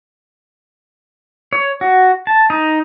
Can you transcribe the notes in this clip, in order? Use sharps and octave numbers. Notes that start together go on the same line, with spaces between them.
C#5
F#4
A5
D#4